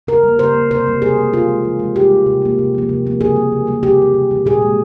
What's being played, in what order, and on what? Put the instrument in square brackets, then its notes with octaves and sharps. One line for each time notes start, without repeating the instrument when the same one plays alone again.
[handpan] C#3 A#4
G3 A#3
C#3 C5
G3 A#3
C3 C5
G3 A#3
C3 G#4
G3 A#3
E3 F4
G#3
E3
G#3
C3 G4
G3 A#3
C3
G3 A#3
C3
F3 A#3
C3
F3 A#3
C#3 G#4
G3 A#3
C#3
G3 A#3
C3 G4
E3 G3
C3
E3 G3
A#2 G#4
G#3